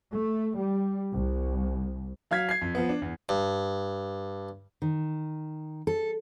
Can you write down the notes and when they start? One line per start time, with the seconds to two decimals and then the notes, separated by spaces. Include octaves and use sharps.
0.12 A3
0.56 G3
1.13 C2
2.31 F#3 F5 F6 G#6 B6
2.49 G#6 C7
2.61 F2
2.75 F3 B3
2.89 D4
3.02 E2
3.29 G2
4.82 D#3
5.87 A4